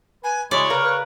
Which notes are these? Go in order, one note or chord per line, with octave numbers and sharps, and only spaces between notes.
B4 G#5
C#3 F#3 G#3 E4 C#5 D5
C#3 A#4 B4 F5
B4